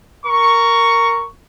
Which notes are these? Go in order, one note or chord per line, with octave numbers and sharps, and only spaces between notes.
A#4 C#6